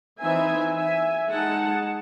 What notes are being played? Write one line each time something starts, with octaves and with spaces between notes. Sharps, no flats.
E3 C4 D#4 E5 G#5
E5 G#5
G#3 D#4 F#5 A5